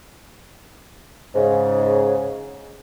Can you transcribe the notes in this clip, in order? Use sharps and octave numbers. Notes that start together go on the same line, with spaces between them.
G#2 C#3